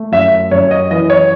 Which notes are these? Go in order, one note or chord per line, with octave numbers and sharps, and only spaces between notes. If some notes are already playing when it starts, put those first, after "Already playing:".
Already playing: A3
F#2 E5
F#2 C#5
D#5
E3 D#5
C#5